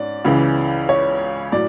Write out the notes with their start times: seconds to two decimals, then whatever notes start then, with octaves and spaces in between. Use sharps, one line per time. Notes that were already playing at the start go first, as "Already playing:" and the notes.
Already playing: G#2 C#4 D5
0.25 C#2 C#3 E3
0.89 C#5
1.52 A2 F#3 D5